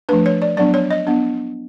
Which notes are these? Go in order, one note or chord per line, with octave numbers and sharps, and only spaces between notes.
F3 A3 D4 B4
C#5
D5
F#3 B3 D4 D5
C#5
D#5
B3 D4